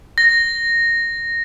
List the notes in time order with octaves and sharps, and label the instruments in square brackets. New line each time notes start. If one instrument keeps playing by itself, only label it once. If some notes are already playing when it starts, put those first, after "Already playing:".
[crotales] A#6